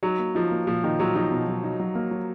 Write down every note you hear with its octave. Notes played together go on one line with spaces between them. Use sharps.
F#3 D#4
A#3
F3 D#4
A#3
A#2 F3
A#2 D#3
A#2 F#3
F3 D#4
B2
F#3
D#4
F#3
A#3
F#3